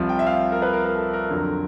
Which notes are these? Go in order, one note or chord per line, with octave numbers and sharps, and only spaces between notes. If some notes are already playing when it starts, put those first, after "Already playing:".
Already playing: C2 C3 F3
G5
E5
F5
A#4
B4
A#4
A#4
A4
A#4
F2 D3 F#3